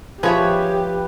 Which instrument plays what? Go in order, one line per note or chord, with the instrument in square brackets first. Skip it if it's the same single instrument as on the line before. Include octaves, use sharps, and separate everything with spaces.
[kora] F3 [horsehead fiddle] G4 [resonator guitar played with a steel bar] G#4 C#5 E5 [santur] B4